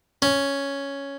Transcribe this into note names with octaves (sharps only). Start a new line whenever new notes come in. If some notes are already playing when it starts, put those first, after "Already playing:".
C#4